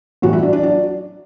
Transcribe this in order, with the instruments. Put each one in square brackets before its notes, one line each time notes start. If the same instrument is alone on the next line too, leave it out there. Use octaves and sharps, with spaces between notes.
[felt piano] A1 A2 E3 F#3 G3 F#4
E4 E5
D4 D5
D4 D5
F#3 D4 D5